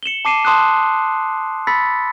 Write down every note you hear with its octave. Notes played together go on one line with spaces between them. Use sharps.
C#7 E7 F#7 G7
A5 D6 C7 D#7 E7
A5 C6 D#6 E6 F#6
B5 E6 A6 B6 C#7